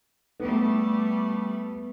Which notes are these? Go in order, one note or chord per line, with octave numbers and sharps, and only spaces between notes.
G3 A3 B3